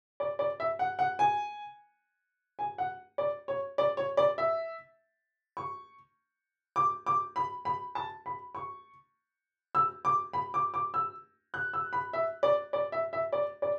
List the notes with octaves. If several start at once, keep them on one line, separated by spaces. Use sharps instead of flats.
D5
D5
E5
F#5
F#5
G#5
G#5
F#5
D5
C#5
D5
C#5
D5
E5
C#6
D6
D6
B5
B5
A5
B5
C#6
E6
D6
B5
D6
D6
E6
F#6
E6
B5
E5
D5
D5
E5
E5
D5
D5